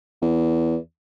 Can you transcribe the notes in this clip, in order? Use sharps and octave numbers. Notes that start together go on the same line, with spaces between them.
E2